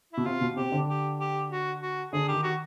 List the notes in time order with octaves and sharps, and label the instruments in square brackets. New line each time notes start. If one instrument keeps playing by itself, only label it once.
[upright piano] B2 [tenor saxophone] E4
[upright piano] C3 [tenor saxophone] F4
[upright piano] B2
[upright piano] C3 [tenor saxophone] G4
[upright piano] D3
[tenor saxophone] G4
G4
F#4
F#4
[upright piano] D3 [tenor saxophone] G#4
[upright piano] D#3 [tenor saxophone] G4
[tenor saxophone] F#4